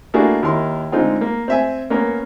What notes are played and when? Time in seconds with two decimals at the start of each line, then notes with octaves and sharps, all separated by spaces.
0.14 A3 A#3 D4 E4 F#4 G#4
0.43 D#2 E4 A#4 C6
0.92 D3 G#3 C4 D#4 F4
1.21 A#3
1.48 C4 E5 G#5
1.90 A#3 B3 C#4 A#4